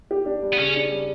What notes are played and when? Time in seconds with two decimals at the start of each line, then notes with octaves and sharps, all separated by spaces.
0.11 G4
0.26 D4
0.43 G3
0.53 B3
0.58 C#3 C#4
0.76 D4
0.92 G3